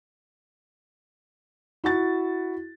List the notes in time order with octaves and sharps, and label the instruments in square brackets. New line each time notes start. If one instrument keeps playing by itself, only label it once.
[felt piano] E4 F#4 A6